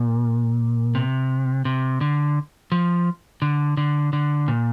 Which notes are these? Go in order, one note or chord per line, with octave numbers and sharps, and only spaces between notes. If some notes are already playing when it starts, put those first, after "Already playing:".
Already playing: A#2
C3
C3
D3
F3
D3
D3
D3
A#2